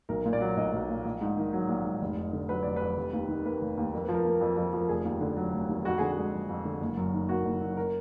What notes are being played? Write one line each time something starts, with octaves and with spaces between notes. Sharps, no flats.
B1 A#4
A#2
D5
F#3
B1 D#5
B1
A#2
A#1
G#2
D#3
F#3
A#1
G#2
F1
F2
D3
F#3 B4
F1 D5
F2 B4
F1
D#2
D#3
A#3 B4
F1
D#2
F2 A#4
F3 B4
A#4
A#3
F2
F2
F3 A#4
F1 G#4
D#2
D3
F#3
F1
D#2
F2 F#4
D3 G#4
F#4
G#3
F2
F2
D3
F#1
F#2
D#3
A#3 F#4
F#1
F#2
A#4